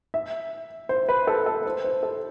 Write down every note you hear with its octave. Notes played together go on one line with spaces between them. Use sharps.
E5
C5
B4
A4
A4
C5
C5
A4